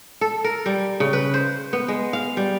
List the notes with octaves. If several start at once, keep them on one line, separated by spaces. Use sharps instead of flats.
A4
A#4
G3
C#3
B4
C5
B3
G#3
F5
G3